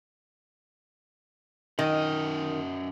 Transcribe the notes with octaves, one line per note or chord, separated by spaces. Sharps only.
F#2 D#3 D#5